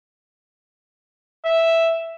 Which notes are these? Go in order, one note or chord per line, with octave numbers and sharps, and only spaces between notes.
E5